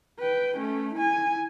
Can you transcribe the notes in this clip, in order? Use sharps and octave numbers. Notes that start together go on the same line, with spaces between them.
B4 G5
A3 C#4
E4 G#5